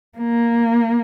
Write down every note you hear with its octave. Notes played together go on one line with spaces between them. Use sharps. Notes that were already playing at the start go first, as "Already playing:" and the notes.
A#3